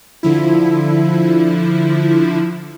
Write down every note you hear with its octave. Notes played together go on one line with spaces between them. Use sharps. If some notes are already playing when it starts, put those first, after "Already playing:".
D3 F3 E4